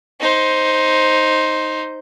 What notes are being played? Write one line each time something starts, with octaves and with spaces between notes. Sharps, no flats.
D#4 C5